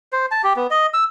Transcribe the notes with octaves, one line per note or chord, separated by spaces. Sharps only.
C5
A5
G4
B3
D#5
E6